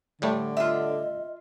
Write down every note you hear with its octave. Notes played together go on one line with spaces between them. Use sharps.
A2 D3 G3 A3
F4 D#5 E5